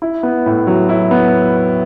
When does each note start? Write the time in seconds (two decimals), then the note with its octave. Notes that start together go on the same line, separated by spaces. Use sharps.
0.02 E4
0.23 B3
0.46 A2
0.67 F#3
0.89 E4
1.11 B3